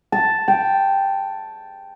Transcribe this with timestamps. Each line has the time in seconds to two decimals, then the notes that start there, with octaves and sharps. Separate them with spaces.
0.12 A5
0.48 G5